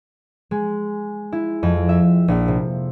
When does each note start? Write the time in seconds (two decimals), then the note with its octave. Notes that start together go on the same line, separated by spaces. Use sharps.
0.51 G#3
1.33 E4
1.63 F2
1.89 E5
2.28 A#1
2.48 C3